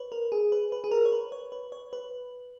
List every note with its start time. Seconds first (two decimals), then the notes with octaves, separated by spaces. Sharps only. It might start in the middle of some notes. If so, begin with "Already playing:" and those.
Already playing: B4 C#5
0.12 A#4
0.32 G#4
0.52 B4
0.72 B4
0.84 G#4
0.91 A#4
1.05 C#5
1.12 B4
1.32 C#5
1.52 B4
1.72 C#5
1.93 B4